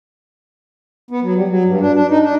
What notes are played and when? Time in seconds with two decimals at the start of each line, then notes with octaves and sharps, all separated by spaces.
1.10 B3
1.22 F#3
1.35 G3
1.48 F#3
1.65 G2
1.81 D4
1.94 D4
2.10 D#4
2.22 D4